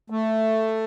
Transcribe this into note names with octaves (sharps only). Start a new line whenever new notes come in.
A3